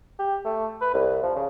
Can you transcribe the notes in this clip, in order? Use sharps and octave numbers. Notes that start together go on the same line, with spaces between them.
G4
A3
B4
C2
F3
C#3